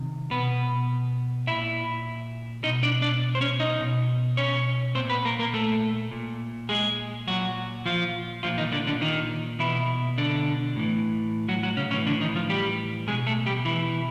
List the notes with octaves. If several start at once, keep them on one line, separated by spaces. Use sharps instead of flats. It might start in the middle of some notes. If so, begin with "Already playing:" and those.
Already playing: C3 D#3
B2 B3 B4
A#2 E4 E5
B2 D#4 D#5
D4 D5
D4 D5
C5
C#4 C#5
D#4 D#5
B2
C#4 C#5
A#2 C4 C5
B3 B4
A#3 A#4
A#3 A#4
A3 A4
A#2
G#3 G#4
A#2 F#3 F#4
F3 F4
A#2 F3 F4
D#3 D#4
D3 D4
D3 D4
D#3 D#4
B2 E3 E4
D3 D4
A2 E3
F#3 F#4
F#3 F#4
C#3 C#4
A2 C#3 E3 C#4
D3 D4
D#3 D#4
F3 F4
G3 G4
B2 G#3 G#4
A3 A4
G3 G4
E3 E4